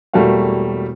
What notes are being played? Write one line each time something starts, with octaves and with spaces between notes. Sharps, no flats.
E1 G3 A3 A#3 F#4 F5